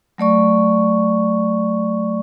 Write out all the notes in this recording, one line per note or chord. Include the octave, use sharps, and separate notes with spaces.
F#3 A3 D5 C#6